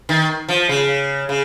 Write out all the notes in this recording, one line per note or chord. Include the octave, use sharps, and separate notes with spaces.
D#3
F3
C#3
C#3